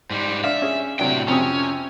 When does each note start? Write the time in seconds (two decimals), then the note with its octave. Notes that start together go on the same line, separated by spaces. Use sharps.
0.11 G#2 G3
0.44 D4 D5 E5 F5
0.62 C#4 G#4
0.99 A2 C3 F#3 D4 G5
1.28 F2 C3 C#4 D#6